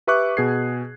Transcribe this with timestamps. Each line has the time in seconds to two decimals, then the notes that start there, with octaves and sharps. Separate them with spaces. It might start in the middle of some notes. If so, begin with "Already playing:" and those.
0.07 G4 B4 E5 C#6 D6 F#6
0.37 B2 G#4 G#6 C7